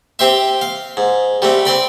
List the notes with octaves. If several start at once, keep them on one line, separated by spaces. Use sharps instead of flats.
C4 G4 C5 E5
F5
G#2
G3 A3 C4
C4 D5 B5